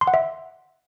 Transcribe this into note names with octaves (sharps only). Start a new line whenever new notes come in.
C6
F#5
E5